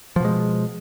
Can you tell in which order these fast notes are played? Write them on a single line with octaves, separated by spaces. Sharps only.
F3 B2 G#3